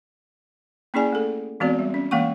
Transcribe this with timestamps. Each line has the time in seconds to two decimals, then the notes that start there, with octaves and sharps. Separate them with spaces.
0.94 A#3 C#4 E4 G#4 D5 G#5
1.13 A3 A4
1.60 E3 G#3 B3 C4 F#4 D5
1.79 G3
1.94 C#4
2.11 E3 G#3 A#3 F5 F#5 C#6